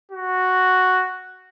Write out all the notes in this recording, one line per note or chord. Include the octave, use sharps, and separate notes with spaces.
F#4